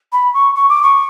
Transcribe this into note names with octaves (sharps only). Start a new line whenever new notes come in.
B5
C#6
C#6
D6
C#6